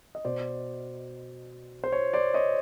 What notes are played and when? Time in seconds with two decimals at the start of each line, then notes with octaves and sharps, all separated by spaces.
0.15 D#5
0.25 B2 C5 D5
1.84 C5
1.92 C#5
2.13 C5 D5
2.34 C#5 D#5